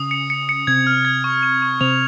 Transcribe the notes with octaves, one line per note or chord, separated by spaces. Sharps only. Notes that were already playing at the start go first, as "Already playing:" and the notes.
Already playing: C#3 C#4 D#6
C#7
C#7
C#7
C3 C4 G#6
F6
G#6
C#6
C#6
C#6
C3 C4 F7